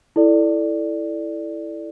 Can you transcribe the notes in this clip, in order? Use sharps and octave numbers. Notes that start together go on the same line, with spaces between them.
E4 A4 D5